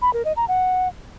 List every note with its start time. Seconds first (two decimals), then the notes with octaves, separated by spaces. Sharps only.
0.02 B5
0.13 A#4
0.25 D#5
0.37 A#5
0.48 F#5